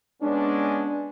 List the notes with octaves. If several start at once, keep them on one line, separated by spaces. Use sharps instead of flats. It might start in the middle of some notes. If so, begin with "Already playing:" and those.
G#3 B3 C#4 D4